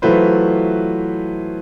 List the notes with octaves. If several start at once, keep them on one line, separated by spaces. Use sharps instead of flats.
E3 F#3 A3 F4 B4 C5